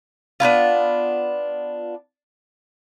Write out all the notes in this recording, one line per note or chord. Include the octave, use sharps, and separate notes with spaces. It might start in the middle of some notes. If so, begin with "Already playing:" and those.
B3 D4 E4 F4